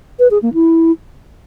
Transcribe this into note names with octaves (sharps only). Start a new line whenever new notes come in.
B4
G#4
A#3
E4